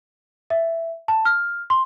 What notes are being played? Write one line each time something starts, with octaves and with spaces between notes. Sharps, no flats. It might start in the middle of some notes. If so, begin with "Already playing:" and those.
E5
A5
F6
C6